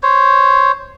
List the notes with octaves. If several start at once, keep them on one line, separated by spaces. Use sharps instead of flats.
C5 C#5